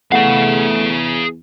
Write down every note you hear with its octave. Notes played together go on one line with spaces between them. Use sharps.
E2 A3 G#4 F5 F#5